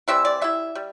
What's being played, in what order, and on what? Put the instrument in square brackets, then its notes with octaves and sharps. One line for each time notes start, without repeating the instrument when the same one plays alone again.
[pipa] E3 G3 C4 E4 E5
D5
G3 E4 E5
G3